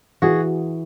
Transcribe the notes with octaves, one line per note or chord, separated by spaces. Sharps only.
E3 F#4 G#4